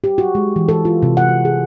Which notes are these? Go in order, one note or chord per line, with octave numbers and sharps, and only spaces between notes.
G4
F#4
G#3
E3
A4
F4
C3
F#5
F#4
G#4